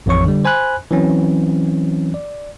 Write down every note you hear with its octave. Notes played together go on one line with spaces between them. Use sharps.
A1 F2 E3 C#5 C#6
D3 G3
C5 G#5 B5 F#6
E3 F#3 C4 C#4
D5